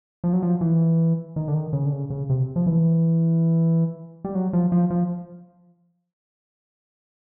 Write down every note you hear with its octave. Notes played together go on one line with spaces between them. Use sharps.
F3
F#3
F3
E3
D#3
D3
D#3
C#3
D3
C#3
C#3
C3
F3
E3
G3
F#3
F3
F3
F3